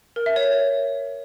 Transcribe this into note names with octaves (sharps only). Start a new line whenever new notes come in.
A#4
E5
C#5